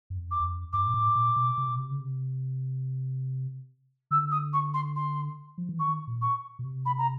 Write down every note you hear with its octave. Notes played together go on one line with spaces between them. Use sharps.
F#2
F2
D6
E2
F2
G2 D6
A#2
A2
A#2
B2
C3
B2
C3
C#3
C3
D3 E6
D#6
C#6
C6
C6
F3
E3
D#3 C#6
A#2
C#6
B2
C3
B5
A#5